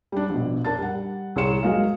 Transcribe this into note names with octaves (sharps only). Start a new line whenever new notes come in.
G3 D4
A#1 B2
D4 A#4 A5 A6
G3 F#5
C2 G#4 C#5 C6 C#7 E7
F#3 G#3 A#3 F5